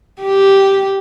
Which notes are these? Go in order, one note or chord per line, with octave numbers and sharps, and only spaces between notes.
G4